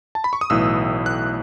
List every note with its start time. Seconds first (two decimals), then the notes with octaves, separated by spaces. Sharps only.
0.15 A5
0.24 B5
0.33 C#6
0.41 D#6
0.50 B1 A2 E3 E6
1.06 F#6